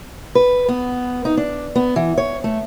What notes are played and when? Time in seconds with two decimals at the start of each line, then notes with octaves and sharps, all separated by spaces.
0.35 B4
0.68 B3
1.25 D#4
1.37 D4
1.75 B3
1.96 E3
2.18 C#5
2.44 A3